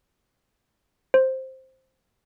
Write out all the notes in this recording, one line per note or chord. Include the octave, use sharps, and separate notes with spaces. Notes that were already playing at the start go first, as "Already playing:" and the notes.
C5